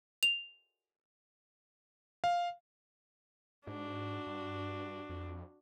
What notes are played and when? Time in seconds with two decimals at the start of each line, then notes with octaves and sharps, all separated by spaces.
0.23 F7
2.24 F5
3.67 G#2 D4 F#4
4.27 G2
5.09 F2